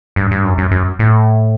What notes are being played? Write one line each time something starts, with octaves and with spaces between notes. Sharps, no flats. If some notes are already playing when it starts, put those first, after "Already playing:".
G2
G2
F#2
F#2
F#2
A2